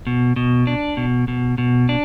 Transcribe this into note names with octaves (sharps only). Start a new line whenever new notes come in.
B2
B2
D4
B2
B2
B2
D4